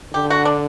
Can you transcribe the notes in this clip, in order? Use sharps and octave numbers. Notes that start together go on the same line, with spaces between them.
D3 G4
F#4
D4